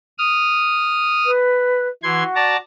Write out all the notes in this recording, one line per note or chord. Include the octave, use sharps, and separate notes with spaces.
D#6 F6
B4
E3 F#4 C6 G#6
D5 A5 A#5